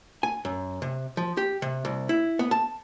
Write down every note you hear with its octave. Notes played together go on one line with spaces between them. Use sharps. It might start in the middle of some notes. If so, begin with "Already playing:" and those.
G#5
F#2
C3
F3
G4
C3
C2
E4
B3
A5